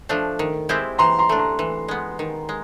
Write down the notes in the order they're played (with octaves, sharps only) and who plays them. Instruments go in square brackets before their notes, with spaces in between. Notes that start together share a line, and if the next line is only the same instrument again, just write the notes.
[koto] F3 A3 D4
D#3
G#3 C4 E4 G4
[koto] E3 [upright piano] A#5 C6
[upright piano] A#5 C6
[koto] A3 D4
[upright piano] A#5 C6
[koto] E3
G#3 B3
D#3
G#3